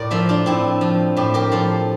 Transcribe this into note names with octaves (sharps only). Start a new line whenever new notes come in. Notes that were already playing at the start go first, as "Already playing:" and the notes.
Already playing: A2 A#4 D5
F3 C5 E5
D4 F4
A2 C4 E4
F3
A2 E4 G4
G4 A#4
F3 A4 C5